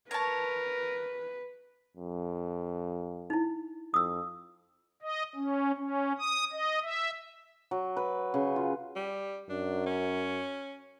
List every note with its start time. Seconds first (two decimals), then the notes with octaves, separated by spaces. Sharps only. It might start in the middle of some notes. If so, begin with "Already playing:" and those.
0.11 A#4 B4 C#5 A5
1.97 F2
3.30 D#4 E4
3.94 F2 D#6 E6
5.02 D#5
5.35 C#4
5.77 C#4
6.18 D#6
6.52 D#5
6.83 E5
7.71 F#3
7.97 B4
8.34 C#3
8.56 F4
8.96 G3
9.49 F#2 D4
9.86 C#4